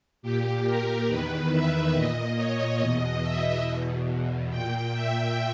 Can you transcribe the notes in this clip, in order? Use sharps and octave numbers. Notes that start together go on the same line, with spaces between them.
A#2 G4
A#4
E2 D#3 B4
E5
A#2 D#5
C#5
E2 B2 D#5
E5
E2 B2
A#2 G5
E5